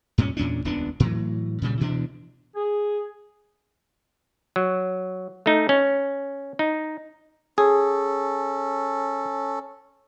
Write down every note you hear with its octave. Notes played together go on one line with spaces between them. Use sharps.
G2 A#2 C4 C#4
E2 A#2 C#4 D4
D#1 C#2 B3 D4
A2 E3 F#3
A#2 C#3 F3 G3
D2 B2 E3 D4
G#4
F#3
A3 D#4
C#4
D#4
C#4 G#4 A4